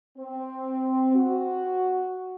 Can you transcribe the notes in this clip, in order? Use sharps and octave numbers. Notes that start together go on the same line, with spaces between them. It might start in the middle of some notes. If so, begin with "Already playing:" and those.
C4
F#4